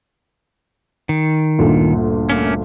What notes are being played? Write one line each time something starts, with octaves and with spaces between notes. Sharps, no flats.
D#3
G1 D2 A#2
A3 A#3 C#4